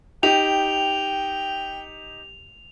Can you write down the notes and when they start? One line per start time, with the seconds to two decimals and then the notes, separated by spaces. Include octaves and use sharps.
0.23 D#4 G4 G5 F7